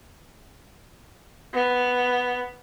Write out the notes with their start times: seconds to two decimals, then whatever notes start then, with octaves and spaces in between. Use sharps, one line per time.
1.54 B3